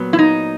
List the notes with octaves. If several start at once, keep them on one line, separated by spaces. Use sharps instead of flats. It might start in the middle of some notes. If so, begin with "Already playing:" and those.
Already playing: A#2 F#3 B3
E4
D#4